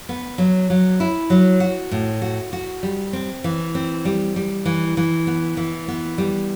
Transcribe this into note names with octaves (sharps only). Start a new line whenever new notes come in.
B3
F#3
F#3
E4
F#3
F#4
A2
F#4
F#4
G3
C4
E3
C4
G3
G3
E3
E3
B3
E3
B3
G3